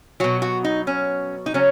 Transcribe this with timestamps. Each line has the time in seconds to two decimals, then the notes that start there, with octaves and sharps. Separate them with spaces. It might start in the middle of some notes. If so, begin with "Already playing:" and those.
0.20 B2 F#3 F#4
0.42 F#4
0.64 D#4
0.87 C#4
1.46 D#4
1.54 C#3 F#3 C#4